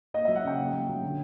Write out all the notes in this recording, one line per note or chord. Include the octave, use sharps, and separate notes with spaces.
A#3 D#5
F#3 E5
F#5
C#3 G5
A#3
F#3
F#3
D3